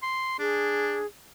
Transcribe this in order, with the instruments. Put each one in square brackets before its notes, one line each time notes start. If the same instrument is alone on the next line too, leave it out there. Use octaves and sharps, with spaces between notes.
[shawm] C6
[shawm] D4 [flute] G#4